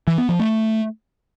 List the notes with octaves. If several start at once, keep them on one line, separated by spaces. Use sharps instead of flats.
E3
B3
F3
A3